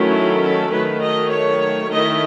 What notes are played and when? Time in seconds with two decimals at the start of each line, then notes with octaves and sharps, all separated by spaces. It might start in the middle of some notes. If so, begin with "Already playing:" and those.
Already playing: D#3 F#3 A3 C#4 E4
0.12 A4
0.41 A4
0.71 D#3 F#3 A3 B4
1.01 D#5
1.30 C#5
1.90 D#3 A3 E4 D#5